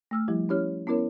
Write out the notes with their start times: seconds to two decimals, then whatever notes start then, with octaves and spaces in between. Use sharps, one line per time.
0.11 A3 E6 F6
0.28 F3 G3 E4 G4
0.49 C#4 E4 G4 C#5 F6
0.87 B3 C#4 E4 A#4 C#5